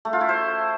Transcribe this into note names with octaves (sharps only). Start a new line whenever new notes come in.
A3
F4
E4
C5